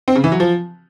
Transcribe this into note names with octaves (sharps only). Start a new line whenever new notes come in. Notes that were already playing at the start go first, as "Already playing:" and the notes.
C4
C#3
E3
F#3
F3